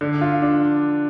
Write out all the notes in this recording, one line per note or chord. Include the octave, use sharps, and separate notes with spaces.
D3
F4
D4